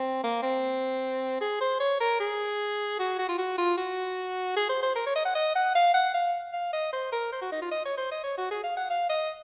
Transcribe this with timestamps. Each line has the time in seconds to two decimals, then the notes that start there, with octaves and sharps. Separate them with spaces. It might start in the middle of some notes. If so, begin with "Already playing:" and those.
Already playing: C4
0.24 A#3
0.43 C4
1.41 G#4
1.61 C5
1.80 C#5
2.01 A#4
2.20 G#4
2.99 F#4
3.19 F#4
3.29 F4
3.38 F#4
3.58 F4
3.78 F#4
4.57 G#4
4.69 C5
4.83 C5
4.96 A#4
5.06 C#5
5.16 D#5
5.25 F#5
5.35 D#5
5.56 F#5
5.75 F5
5.94 F#5
6.14 F5
6.53 F5
6.73 D#5
6.93 C5
7.12 A#4
7.32 C5
7.42 F#4
7.52 D#4
7.62 F4
7.72 D#5
7.85 C#5
7.98 C5
8.11 D#5
8.24 C#5
8.38 F#4
8.51 G#4
8.64 F5
8.77 F#5
8.90 F5
9.10 D#5